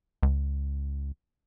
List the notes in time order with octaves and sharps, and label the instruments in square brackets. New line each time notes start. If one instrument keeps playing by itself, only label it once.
[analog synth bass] C#2